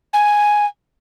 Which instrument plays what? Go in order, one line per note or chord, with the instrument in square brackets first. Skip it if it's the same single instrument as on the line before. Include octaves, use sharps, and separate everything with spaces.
[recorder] G#5